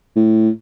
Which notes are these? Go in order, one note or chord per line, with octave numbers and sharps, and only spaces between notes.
A2